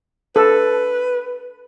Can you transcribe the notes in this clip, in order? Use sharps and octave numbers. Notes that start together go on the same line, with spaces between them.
A4 B4